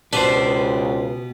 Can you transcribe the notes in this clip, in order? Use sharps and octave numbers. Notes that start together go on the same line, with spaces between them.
C#2 B2 B3 D4 G4 B4 C5